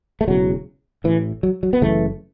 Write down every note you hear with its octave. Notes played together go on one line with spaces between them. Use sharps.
A3
E1 E2 C#3 F#3
A1 A2 E3
F#3
F#3
B3
F#1 F#2 C#3 E3 A3